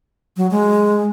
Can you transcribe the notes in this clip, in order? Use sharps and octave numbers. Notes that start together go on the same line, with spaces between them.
F#3
G#3